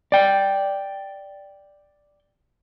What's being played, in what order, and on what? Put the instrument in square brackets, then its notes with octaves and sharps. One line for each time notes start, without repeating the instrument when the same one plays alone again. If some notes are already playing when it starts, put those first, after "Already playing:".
[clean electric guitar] D5 G5